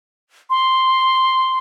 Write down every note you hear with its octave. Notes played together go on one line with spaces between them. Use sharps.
C6